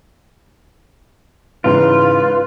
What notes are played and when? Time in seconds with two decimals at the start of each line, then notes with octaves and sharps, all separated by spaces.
1.64 G#2 C#3 E3 F4 B4